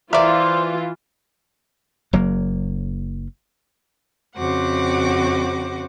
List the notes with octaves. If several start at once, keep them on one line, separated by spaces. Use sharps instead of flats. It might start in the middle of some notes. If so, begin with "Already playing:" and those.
E3 F4 A#4 C5 D5 E5
F#1 F#3 A#3
F2 C#3 F#4 C5 F#5 D6